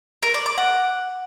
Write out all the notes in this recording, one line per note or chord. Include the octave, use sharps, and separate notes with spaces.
A#4
D5
D6
F#5